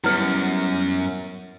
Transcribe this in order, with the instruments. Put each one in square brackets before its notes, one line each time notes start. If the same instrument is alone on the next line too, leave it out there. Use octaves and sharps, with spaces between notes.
[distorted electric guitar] F#2 [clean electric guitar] G3 B3 C#4 [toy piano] E4 B4